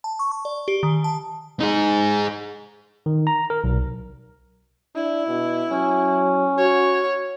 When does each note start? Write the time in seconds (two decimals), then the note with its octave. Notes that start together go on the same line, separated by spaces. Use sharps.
0.04 A5
0.19 C#6
0.32 C#6
0.45 D5
0.68 G4
0.83 D#3
1.04 A5
1.61 D#4 G#4
3.06 D#3
3.27 A#5
3.50 A#4
3.64 B1
4.95 D4 E4
5.28 B2
5.70 F#3 C#4
6.58 F#4 C#5